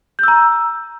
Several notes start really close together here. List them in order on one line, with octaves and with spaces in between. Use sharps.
G6 E6 A#5